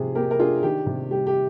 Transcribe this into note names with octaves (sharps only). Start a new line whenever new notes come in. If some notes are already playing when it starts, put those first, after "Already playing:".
Already playing: C3 F3 G#4
A#3 G4 A#4
A#4
D4 F4 G#4
D#3 G4
C3
G3 G4
G4